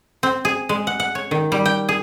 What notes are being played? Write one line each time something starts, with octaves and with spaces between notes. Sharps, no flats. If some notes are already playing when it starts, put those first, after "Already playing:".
C4
G#4
G#3
F#5
F#5
C#5
D#3
G3
G5
G#4